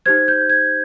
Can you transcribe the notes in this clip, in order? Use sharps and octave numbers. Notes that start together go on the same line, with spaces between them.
D#4 G4 C5 G#6
G6
G#6